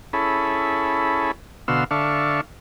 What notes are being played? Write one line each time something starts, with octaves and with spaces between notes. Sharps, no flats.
C#4 E4 G#4 A4 B5
B2 D3 F#4 F5 C6 E6
D3 D4 A4 E5 F5 C#6